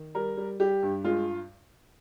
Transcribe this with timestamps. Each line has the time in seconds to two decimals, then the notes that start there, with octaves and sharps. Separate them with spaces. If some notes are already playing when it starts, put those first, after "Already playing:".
Already playing: D#3
0.15 G3 A#4
0.37 G3
0.60 G3 G4
0.83 G2
1.04 G#3 F4